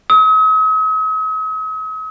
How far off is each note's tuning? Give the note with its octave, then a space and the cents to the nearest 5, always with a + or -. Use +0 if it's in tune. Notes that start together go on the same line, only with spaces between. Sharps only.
D#6 +45